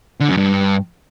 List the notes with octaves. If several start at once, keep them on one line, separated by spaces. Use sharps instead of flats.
D3
F#2
G2